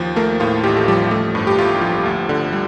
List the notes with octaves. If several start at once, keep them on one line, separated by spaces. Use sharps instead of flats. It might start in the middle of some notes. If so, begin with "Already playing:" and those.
Already playing: D#2 F3
A3 A#3 A#4
A2 F4
A1 G4
A4
F3 G3 G4
A3
G2
G4
G1 F4
F3
D2
D3
G3